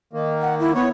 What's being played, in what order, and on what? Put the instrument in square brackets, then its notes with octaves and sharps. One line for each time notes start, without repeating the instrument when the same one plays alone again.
[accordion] D#3 A#3
[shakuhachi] F#5
E4
[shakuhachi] B3 [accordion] C#5